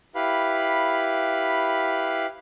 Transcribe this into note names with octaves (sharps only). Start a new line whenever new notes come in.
E4 G4 B4 F5 B5